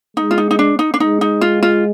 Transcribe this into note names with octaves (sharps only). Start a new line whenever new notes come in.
G#3 D#4
F4
D#4
D#4
D4
D#4
D4
G#3 D#4
D#4
F4
F4